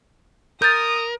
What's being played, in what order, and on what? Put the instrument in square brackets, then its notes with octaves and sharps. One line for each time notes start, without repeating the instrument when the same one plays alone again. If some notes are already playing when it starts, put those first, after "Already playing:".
[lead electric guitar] A#4 [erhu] D#6 [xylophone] G6 A6